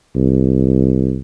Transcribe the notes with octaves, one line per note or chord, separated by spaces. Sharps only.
C2